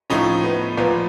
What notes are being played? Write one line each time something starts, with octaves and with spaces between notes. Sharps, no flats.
A2 F3 A3 C#4 D#4
B3
A#2 F3 A#3 B3